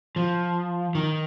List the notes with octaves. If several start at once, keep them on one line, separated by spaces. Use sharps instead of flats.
F3
D#3